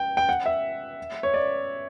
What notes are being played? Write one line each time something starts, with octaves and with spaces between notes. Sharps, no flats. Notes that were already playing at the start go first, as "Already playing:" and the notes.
Already playing: G5
G5
F#5
E5
C#5
D5